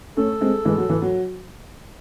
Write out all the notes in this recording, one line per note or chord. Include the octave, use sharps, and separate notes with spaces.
A3 C#4 A4
G#3 C4
E3 G#3
F#3
E3
F#3